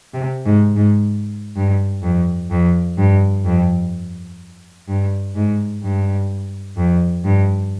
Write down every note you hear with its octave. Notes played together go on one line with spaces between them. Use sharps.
C3
G#2
G#2
G2
F2
F2
G2
F2
G2
G#2
G2
F2
G2